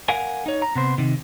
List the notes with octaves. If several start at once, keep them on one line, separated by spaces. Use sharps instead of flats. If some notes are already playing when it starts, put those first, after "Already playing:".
A#4 F5 F#5 G#5
D#4 C#5
A#5
C3 B3 C5
C3 D#3